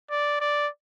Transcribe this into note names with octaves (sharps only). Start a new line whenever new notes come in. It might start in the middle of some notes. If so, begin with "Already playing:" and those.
D5
D5